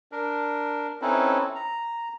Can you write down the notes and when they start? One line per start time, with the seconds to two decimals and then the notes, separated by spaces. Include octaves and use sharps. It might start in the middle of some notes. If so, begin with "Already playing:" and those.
0.12 D4 A#4
1.02 C4 C#4 D#4 E4 A4 B4
1.55 A#5